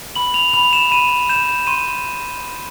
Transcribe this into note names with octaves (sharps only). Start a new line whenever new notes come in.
B5 F#7
F7
B5 F7
E7
B5 D#7
G6 E7
C6 D#7